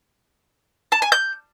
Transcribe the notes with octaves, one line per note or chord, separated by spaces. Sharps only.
A5
G#5
G6